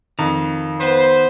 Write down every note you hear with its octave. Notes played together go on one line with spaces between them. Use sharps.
F2 D#3
B3 B4 C5